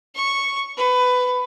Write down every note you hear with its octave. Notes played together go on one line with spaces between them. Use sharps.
C#6
B4